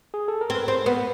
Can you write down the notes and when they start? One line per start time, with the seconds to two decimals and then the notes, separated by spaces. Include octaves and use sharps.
0.14 G#4
0.28 A4
0.41 A#4
0.50 C4
0.55 B4
0.68 C4 C5
0.86 B3 B4